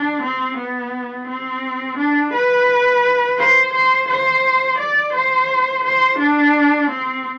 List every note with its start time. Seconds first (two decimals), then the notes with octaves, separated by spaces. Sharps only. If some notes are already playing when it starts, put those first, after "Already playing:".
Already playing: D4
0.22 C4
0.57 B3
1.27 C4
1.98 D4
2.33 B4
3.38 C5
3.74 C5
4.09 C5
4.79 D5
5.14 C5
5.84 C5
6.19 D4
6.90 C4